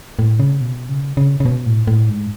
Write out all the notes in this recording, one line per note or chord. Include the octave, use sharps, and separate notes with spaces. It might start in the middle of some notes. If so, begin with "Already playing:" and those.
A2
C#3
B2
C#3
C#3
C#3
B2
A2
A2
G#2